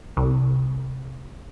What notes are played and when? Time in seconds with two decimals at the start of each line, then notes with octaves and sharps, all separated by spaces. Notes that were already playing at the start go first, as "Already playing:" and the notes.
0.17 C2